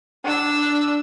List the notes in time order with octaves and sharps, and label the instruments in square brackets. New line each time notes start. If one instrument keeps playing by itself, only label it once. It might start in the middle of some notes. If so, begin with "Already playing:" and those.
[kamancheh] D4 E6